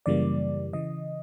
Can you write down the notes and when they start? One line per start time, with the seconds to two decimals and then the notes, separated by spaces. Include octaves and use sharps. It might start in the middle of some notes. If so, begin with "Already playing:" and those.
0.06 F#2 C#3 E3 G3 A#3 D5
0.73 C#3 E3 D#5